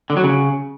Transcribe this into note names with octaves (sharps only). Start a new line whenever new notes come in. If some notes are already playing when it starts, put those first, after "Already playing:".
D3
F#3
C#3